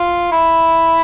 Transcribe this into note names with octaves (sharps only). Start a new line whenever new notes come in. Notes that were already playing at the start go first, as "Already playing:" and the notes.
Already playing: F4
E4